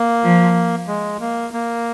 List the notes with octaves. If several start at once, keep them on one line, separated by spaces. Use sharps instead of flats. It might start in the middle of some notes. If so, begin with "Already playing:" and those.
Already playing: A#3
F3
G#3
A#3
A#3